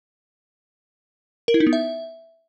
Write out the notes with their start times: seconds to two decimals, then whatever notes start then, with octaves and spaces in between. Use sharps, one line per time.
1.48 A#4
1.54 E4
1.60 D#4
1.67 B3
1.73 E5